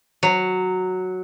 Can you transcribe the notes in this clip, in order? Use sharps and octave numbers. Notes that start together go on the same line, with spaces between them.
F#3